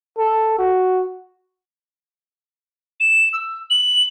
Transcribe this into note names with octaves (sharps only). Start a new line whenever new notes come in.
A4
F#4
E7
E6
F#7